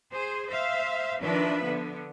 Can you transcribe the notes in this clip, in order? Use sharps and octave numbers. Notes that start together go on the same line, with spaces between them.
G#4 C5
C5 E5 F5
D#3 F3 D4 B4 E5
D3 B3